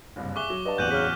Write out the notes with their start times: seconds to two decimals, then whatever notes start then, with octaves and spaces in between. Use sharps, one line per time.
0.16 F#1 C2 G2
0.36 G#4 E5 C#6 D6 F#6 G7
0.50 F#3
0.65 G2 D#5 A5
0.78 D1 A1 E2 F#5 G6 D#7 F#7
0.91 C#3 F6 B6